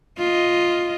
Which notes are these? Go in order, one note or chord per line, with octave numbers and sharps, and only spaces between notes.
F4 D#5